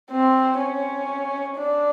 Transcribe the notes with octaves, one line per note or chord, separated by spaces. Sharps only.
C4
C#4
D4